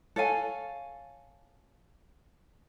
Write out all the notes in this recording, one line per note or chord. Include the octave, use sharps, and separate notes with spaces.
A4 C#5 F5 G#5